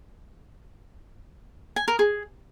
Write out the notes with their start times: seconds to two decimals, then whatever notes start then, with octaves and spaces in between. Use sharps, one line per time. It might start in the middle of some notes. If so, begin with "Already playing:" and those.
1.76 G#5
1.88 A#4
1.99 G#4